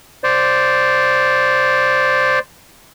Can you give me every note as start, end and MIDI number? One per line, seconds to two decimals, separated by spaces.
0.24 2.39 72
0.24 2.39 74